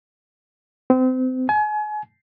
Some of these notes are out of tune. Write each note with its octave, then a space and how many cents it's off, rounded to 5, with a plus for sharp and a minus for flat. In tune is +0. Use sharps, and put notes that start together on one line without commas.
C4 -30
G#5 +35